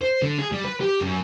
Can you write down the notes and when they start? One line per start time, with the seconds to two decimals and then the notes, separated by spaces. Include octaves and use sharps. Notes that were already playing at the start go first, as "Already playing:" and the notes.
0.02 C5
0.22 D3
0.38 G#4
0.52 G3
0.64 B4
0.81 G4
1.00 F#2